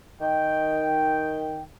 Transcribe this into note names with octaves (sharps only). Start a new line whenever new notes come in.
D#3 G5